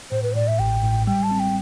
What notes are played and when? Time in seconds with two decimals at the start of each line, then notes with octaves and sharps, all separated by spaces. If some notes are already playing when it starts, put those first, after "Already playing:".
0.11 A2 C5
0.23 B4
0.32 C5
0.35 A2 D5
0.48 E5
0.59 A1 G5
0.83 A2
1.07 G3 G5
1.23 A5
1.31 C4
1.39 G5